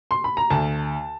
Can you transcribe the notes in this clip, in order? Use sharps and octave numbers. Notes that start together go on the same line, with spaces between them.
C6
B5
A#5
D2 A5